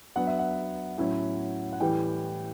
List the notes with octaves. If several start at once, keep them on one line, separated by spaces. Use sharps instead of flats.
F#3 B3 D4 F#5
E5
F#5
A2 F#3 C#4 E4
F#5
A2 E3 G3 G5